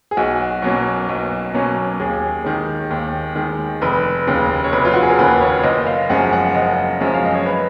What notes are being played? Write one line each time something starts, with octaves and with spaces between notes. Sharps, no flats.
G#4
B1 F#4
B2 F#3 A#3 C#4
B1
B2 F#3 A#3 C#4
D#2 G#4
D#3 G#3
D#2
D#3 G#3
F1 B4
D#2 C#3
C#5
F1 B4
F4
F#4
G#4
A#4
D#2 C#3 B4
C#5
F#1 D#5
F5
F#2 F3 G#3 C#4 F#5
F#5
F#1 D#5
F#2 F3 G#3 C#4
F5
D#5
C#5
B4